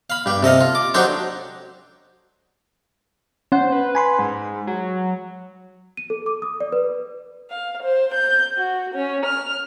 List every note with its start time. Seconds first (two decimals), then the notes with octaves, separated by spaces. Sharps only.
0.10 F5 B5
0.26 G2 G4
0.43 C3 A4 D#5 F5
0.61 F4
0.75 D6
0.94 F#3 D4 D#4 G4 A4 C5
3.52 C#4 C5 F#5
3.72 B4
3.95 G#5 B5 C6
4.19 G#2
4.67 F#3
5.97 D#7
6.10 A4
6.26 D6
6.42 D#6
6.60 D5
6.72 B4
7.49 F5
7.82 C5
8.13 G6
8.56 F#4
8.94 C#4
9.25 F6